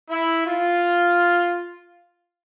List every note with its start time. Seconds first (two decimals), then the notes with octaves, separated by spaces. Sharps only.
0.10 E4
0.46 F4